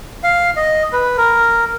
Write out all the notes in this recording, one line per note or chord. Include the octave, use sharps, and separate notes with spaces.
F5
D#5
B4
A#4